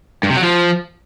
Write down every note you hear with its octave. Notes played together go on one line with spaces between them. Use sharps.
G2
C3
F#3
F3